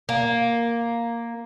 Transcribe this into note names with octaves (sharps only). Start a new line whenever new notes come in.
A#3